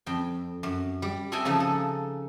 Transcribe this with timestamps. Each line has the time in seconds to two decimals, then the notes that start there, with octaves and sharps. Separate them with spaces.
0.06 F2 G5
0.63 F#2
1.02 G3
1.32 C4 A4 D#5 E5 G5 G#5
1.45 C#3 F3 D#4
1.60 A4